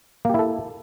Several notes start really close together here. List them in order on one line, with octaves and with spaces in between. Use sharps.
A#3 G4 E4 A4